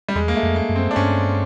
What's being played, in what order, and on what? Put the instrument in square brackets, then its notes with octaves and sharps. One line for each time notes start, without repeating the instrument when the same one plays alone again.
[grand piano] G3
[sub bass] E2 [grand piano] G#3
[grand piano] A#3
A3
[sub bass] F2
[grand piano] A#3
[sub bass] F#2
[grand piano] C4
D4
[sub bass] G2 [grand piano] C#4